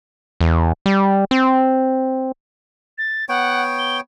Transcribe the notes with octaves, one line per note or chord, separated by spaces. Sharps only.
E2
G3
C4
A6
B3 C#5 F#5 G5
G7